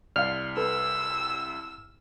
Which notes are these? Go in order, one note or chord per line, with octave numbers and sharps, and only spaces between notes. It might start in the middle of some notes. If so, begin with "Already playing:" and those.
C2 D5 F5 F6
A4 B4 E6